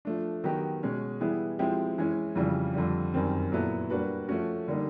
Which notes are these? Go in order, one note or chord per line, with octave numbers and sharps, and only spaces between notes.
F3 A3 D4
D#3 F#3 B3 D#4 G4
B2 G#3 C#4
E3 G3 B3 E4 G#4
F3 G#3 C4 E4 G4
E3 G#3 C#4 E4
F2 C#3 E3 G3
F2 D3 G3
F#2 D#3 G3 C4
A#2 F#3 B3 E4 A4
G3 A#3 D4 F#4 B4
F3 A3 C#4 F#4
D3 G3 A#3 D#4